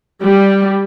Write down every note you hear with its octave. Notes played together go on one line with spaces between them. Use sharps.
G3